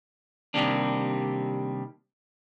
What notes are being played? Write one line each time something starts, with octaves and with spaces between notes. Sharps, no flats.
C3 D#3 G3 A#3 D4